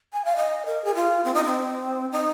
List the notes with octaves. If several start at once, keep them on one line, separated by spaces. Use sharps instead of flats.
G#5
F5
D#5
A#4
G#4
F4
C4
D#4
C4
D#4